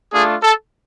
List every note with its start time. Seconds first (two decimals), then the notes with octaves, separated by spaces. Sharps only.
0.13 A3 D4 F4 G#4
0.43 A4